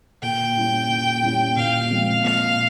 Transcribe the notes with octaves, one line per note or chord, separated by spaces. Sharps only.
A#2 G5
G3 C#4 E4
A#2
G3 C#4 E4
A#2 F5
F3 G#3 C4
A#2 F5